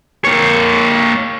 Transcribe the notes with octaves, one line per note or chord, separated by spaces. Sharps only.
A#3 C#5